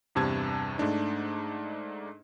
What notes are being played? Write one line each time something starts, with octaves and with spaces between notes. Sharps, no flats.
E2 G2 C3 A5 G#6
G#2 A3 D4 D#4